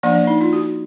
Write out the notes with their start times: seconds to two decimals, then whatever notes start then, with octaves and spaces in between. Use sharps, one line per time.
0.03 F3 A#3 D4 D5
0.15 D5
0.27 D#4
0.41 F4
0.53 F#4